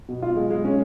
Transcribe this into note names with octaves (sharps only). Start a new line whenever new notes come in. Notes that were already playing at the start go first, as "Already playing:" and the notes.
B2
F4
G#3
G#3
C#4